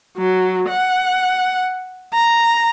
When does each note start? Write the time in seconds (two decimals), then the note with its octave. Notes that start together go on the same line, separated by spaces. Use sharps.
0.17 F#3
0.69 F#5
2.14 A#5